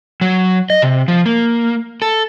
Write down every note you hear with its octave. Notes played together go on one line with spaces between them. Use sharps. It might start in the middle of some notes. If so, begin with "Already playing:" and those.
F#3
D#5
C3
F3
A#3
A4